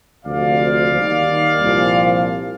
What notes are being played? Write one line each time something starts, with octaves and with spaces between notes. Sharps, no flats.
D2 C3 F3 D5 F5
D#2 D#3 G3
C2 A#2 F3